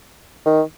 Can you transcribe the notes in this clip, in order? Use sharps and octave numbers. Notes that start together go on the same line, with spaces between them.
D#3